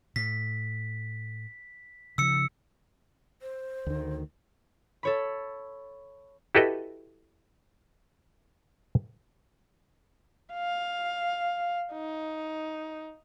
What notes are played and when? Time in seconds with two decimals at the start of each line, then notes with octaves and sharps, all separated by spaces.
0.16 A2 B6
2.18 C#3 F3 E6 C#7
3.42 C5
3.87 D2 D#3
5.03 A4 C#5 B5
6.55 E4 F#4 G4 A4 B4 D#5
10.54 F5
11.93 D#4